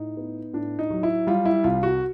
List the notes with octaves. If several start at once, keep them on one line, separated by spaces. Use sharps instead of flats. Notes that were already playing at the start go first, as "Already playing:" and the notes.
Already playing: A2 D#4
B3
A2 D4
D#4
F#3
E4
G3 F4
E4
C2 F4
F#4